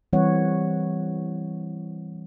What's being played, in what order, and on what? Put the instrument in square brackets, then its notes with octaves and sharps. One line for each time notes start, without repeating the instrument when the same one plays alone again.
[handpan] E3 G3 C4 B4 C#5 F#5